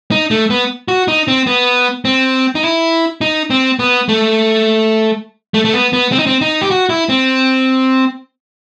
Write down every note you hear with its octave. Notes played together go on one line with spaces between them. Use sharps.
D#4
A3
B3
F#4
D#4
C4
B3
C4
D#4
E4
D#4
C4
B3
A3
A3
A3
B3
B3
C4
D#4
C4
D#4
G4
F#4
E4
C4